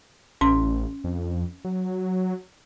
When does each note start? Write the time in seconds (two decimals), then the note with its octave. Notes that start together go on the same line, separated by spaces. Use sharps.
0.41 A1 C#4 C6
1.04 F2
1.64 F#3